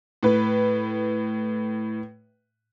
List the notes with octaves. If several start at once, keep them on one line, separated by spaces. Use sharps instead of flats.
A2 B4